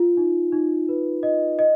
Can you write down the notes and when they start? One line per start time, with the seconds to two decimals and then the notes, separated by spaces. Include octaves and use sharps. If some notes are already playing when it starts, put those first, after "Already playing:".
Already playing: F4
0.17 D#4
0.52 D#4
0.89 B4
1.23 D#5
1.59 D#5